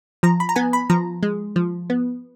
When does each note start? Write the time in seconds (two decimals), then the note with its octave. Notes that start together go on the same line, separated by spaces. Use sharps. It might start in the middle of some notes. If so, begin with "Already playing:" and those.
0.23 F3 A#5
0.40 B5
0.49 A#5
0.56 B3 G#5
0.73 B5
0.90 F3 A#5
1.23 G#3
1.56 F3
1.90 B3